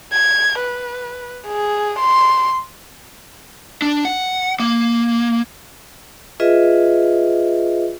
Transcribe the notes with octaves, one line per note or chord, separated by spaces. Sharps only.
G#6
B4
G#4
C6
D4
F#5
A#3
F4 G#4 B4 D#5 E5